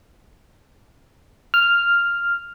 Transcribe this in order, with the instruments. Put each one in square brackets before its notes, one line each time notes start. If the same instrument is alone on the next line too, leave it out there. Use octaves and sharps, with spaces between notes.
[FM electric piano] F6